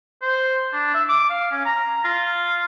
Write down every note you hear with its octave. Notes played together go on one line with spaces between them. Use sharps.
C5
D4
E5
D6
F5
C#4
A#5
F4